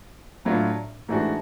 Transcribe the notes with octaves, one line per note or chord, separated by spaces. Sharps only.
A2 F#3 A3 D4 F4
G#2 E3 A3 D4 F#4